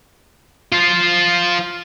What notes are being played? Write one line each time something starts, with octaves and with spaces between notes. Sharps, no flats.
F4 C5